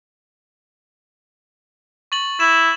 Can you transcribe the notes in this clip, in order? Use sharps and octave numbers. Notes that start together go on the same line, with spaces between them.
C#6 A6 F#7
E4 E7